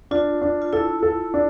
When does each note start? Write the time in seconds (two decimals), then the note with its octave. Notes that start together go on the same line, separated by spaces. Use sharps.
0.11 D4 F4
0.41 D4
0.62 F4
0.73 E4 A4
1.03 A4
1.34 D4